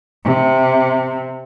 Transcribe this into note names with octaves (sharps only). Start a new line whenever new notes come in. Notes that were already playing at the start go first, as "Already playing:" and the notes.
C3